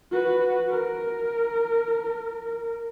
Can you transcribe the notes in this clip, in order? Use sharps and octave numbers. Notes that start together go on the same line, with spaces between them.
F#4 B4
A#4